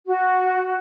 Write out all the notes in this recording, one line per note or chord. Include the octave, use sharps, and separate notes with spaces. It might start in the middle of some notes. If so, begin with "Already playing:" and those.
F#4